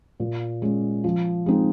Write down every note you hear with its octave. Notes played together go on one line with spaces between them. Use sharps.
A#2
G#3 C#4
F3
G#3 C4 D#4